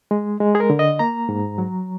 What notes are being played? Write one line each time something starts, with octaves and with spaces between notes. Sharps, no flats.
G#3
G#3
G#4
A#4
D3
D#5
A#3 A#5
G#2
F#3